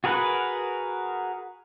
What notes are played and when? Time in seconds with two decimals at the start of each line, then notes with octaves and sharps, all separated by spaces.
0.04 F#4 G#4 A#4 B4 F#5